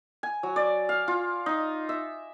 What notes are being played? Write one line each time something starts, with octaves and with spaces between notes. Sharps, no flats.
G#5
F#3
D5
F5
F4
D#4
E5